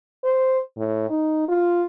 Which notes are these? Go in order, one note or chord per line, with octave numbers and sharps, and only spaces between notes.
C5
A2
D#4
F4